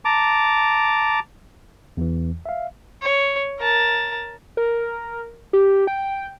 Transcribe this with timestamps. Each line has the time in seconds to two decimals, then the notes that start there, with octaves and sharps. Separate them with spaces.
0.05 A5 A#5 D6
1.97 E2 E3
2.46 E5 F5
3.02 C#5
3.59 A#4 A5
4.57 A#4
5.53 G4
5.87 G5